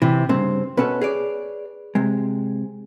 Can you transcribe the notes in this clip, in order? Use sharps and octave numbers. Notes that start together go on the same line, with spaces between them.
C3 E3
G2 C#3 C4
B2 C#4 A4 B4
G#4 C#5 D5
C3 G#3